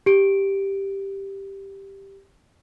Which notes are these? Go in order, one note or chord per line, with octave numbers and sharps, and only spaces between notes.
G4 D7